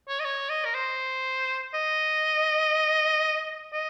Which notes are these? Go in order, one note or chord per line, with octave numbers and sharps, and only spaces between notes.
C#5
D#5
C#5
D#5
A#4
C5
D#5
D#5